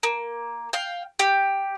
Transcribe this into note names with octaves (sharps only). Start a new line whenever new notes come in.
A#3
F5 G5
G4